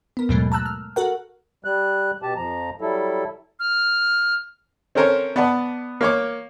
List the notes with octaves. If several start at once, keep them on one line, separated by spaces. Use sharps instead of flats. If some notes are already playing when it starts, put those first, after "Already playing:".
B3 A#4
D#2 G#2 B2 F#3 G#3 A3
A5 A#5 E6 F#6
F6
F#4 A4 A#4 F#5
G3 F#6
B2 G4 A5
F2 F3 A#5
F#3 G3 E4 A4
F6
C4 C#4 A4 A#4 C5 C#5
B3 D5 F#5 A5
A#3 C#5 D6